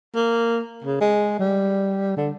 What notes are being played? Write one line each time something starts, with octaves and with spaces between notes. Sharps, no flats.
A#3
C#3
G#3
G3
D3